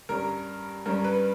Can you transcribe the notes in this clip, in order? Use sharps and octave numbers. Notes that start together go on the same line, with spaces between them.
G2 G3 C#4 A#4
G2 G3 C#4 A#4
B4